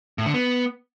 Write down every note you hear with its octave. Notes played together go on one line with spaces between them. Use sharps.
A2
D3
B3